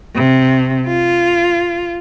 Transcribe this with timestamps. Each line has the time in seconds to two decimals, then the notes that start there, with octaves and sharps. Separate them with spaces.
0.15 C3
0.87 F4